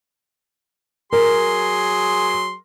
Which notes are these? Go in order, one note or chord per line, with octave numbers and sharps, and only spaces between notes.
F#3 G#4 A#4 C6